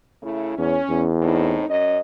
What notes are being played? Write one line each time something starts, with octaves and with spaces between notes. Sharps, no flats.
C#3 A3 E4
E2 C#4
E2
A2 C4 D#4
F#2 C#4 D#5